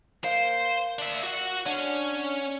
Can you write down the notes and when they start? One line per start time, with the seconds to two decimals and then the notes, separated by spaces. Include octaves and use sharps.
0.24 A#4 C5 F5
0.99 D4 E5
1.23 F#4 F#5
1.66 C#4 D4 F#5